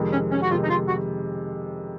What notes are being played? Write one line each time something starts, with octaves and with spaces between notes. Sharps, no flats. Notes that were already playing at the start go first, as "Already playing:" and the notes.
Already playing: F2 C3 D#3 G#3
C#4
C#4
F#4
F2 C3 D#3 G#3 F4
D#4
F4
F#4